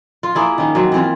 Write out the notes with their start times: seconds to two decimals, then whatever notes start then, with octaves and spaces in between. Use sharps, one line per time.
0.23 F4
0.35 A#3 E4 G#4
0.58 D#3 C#4
0.75 F#3 C4
0.92 E3 C4 F4